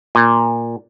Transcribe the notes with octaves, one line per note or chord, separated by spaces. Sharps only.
A#2